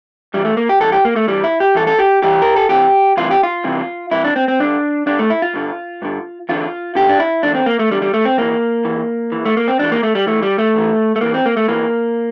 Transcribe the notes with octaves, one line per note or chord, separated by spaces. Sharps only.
G2 E3 G3
A3
A#3
G4
G2 E3 A4
G4
A#3
A3
G2 E3 G3
E4
G4
G2 E3 A4
A4
G4
G2 E3 G4
A#4
A4
C2 C3 E3 G4
C2 C3 E3 F4
G4
F4
C2 C3 E3
C2 C3 E3 E4
D4
C4
C4
G2 D3 D4
G2 D3 D4
A3
E4
F4
G2 D3
G2 D3
E2 D3 F4
E2 D3 G4
D4
E4
E2 D3 D4
C4
A#3
A3
E2 D3 G3
G3
A3
C4
E2 E3 A#3
E2 E3
E2 E3
A3
A#3
C4
E2 E3 D4
A#3
A3
G3
E2 E3 A3
G3
A3
E2 E3
A3
E2 E3 A#3
C4
A#3
A3
E2 E3 A#3